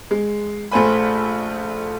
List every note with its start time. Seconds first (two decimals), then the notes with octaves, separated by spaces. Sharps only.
0.11 G#3
0.71 A#1 A3 A4 C5 G#5 B5